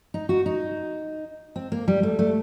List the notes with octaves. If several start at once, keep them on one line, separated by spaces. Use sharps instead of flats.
D#4
F#4
D#4
C4
A#3
G3
A3
A3